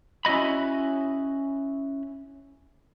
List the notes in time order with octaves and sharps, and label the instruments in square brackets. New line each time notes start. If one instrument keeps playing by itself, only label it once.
[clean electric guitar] C#4 E4 F#4 D#5 B5